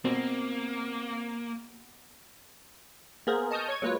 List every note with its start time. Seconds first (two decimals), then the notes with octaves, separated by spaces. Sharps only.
0.05 B2 A#3 C4
3.27 A#3 B3 G#4 A#4 C5
3.51 D#5 A5 C#6 D#6 F6 G6
3.68 C#5 C#6 G#6
3.82 F#3 G#3 A#3 F4 B4 C#5